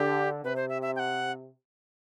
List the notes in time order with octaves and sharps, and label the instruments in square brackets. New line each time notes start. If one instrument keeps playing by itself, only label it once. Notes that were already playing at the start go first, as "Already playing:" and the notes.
Already playing: [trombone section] D3 [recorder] G4
[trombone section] C3 [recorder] B4
[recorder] C5
E5
E5
G5
F#5